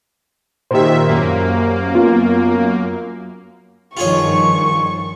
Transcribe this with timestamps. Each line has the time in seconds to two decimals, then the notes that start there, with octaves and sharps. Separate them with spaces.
0.71 A#2 D#3 G4 C5 E5
1.08 F#2 A#3
1.94 B3 F4
3.97 G2 D#3 F3 F4 G#4 C#5 C#6